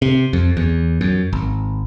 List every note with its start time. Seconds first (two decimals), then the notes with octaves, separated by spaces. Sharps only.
0.02 C3
0.33 F2
0.57 E2
1.01 F#2
1.33 G#1